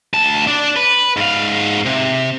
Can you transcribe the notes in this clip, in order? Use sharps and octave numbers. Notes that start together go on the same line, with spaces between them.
D2 A5
D4 D5
B4
G#2 F5
C3